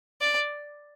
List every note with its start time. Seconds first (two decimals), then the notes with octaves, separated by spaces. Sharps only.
0.21 D5